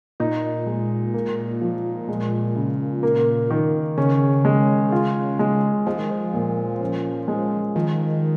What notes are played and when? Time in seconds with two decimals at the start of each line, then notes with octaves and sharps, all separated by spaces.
0.20 A#2 D#4
0.67 G#3
1.14 A#3
1.61 F3
2.08 G#3
2.56 C#3
3.03 A#3
3.50 D#3
3.97 C#3 C#4
4.45 G#3
4.92 F4
5.39 G#3
5.86 F3 G#3
5.98 D#3
6.11 F3
6.33 A#2
6.80 C#4
7.28 G#3
7.75 D#3 F3